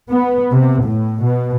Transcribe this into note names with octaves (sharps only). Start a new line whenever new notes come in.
B3
C3
A2
B2